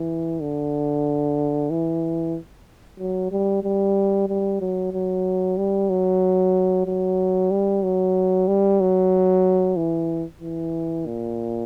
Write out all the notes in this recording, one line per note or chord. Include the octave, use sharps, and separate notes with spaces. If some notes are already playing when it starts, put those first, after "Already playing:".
Already playing: E3
D3
E3
F#3
G3
G3
G3
F#3
F#3
G3
F#3
F#3
G3
F#3
G3
F#3
E3
E3
A#2